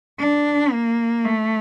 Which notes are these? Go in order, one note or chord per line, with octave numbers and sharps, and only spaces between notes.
D4
A#3
A3